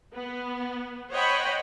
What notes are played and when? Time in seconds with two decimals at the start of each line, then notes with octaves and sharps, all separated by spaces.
0.14 B3
1.11 C5 C#5 D#5 F#5 G5 B5